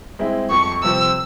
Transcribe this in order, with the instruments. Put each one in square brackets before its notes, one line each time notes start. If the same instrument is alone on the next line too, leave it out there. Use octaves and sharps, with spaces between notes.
[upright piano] G#3 C4 E4
[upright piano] F2 [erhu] C#6
[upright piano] C3 F3 C4 [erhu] E6